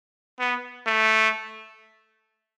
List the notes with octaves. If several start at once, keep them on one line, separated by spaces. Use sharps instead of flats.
B3
A3